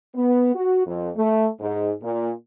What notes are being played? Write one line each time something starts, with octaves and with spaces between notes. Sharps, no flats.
B3
F#4
F2
A3
G#2
A#2